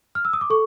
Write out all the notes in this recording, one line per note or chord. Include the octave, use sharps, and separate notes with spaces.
F6
E6
D#6
D6
A4 C#6